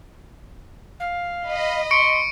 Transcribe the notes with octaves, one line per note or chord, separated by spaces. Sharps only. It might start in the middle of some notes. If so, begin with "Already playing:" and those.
F5
D#5 B5
C6 C#6 C#7 D7